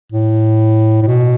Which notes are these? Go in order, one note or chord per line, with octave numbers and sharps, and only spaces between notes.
A2
A2
B2